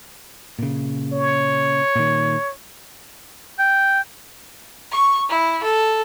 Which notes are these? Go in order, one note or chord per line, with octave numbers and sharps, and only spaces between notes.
A#2 C#3
C#5
A#2 D#3
G5
C#6
E4
A4